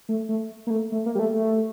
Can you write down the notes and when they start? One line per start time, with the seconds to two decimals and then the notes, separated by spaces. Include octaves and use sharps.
0.09 A3
0.29 A3
0.67 A#3
0.70 A3
0.92 A3
1.06 A#3
1.15 G3
1.19 A3
1.34 A3